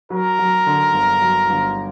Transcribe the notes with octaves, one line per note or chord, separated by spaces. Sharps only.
F#3 A#4
F#3
D3
G1
F#3
G1